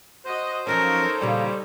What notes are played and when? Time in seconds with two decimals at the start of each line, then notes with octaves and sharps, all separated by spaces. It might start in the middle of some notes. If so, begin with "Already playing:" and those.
0.25 F#4 C5 D#5
0.67 F3 F#3 C#4 D#4 A4 A#4 C#5
1.21 E2 A#2 C#3 G3